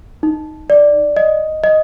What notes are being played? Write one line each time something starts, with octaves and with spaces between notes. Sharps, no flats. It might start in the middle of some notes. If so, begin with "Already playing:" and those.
D#4
D5
D#5
D#5